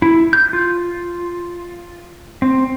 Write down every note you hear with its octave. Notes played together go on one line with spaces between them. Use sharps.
E4
G6
F4
C4